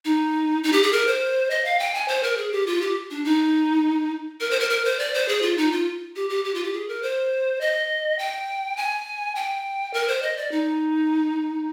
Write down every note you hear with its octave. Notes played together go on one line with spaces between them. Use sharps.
D#4
D#4
G4
G#4
A#4
C5
D#5
F5
G5
G#5
C5
A#4
G#4
G4
F4
G4
D4
D#4
A#4
C5
A#4
A#4
C5
D5
C5
G#4
F4
D#4
F4
G4
G4
G4
F4
G4
G#4
A#4
C5
D#5
G5
G#5
G5
A#4
C5
D#5
D5
D#4